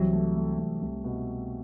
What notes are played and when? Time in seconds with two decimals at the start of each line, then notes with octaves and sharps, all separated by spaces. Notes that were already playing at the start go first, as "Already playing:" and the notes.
Already playing: C2 E3 F#3
0.13 A3
0.36 A3
0.58 C2
0.82 C2
1.04 B2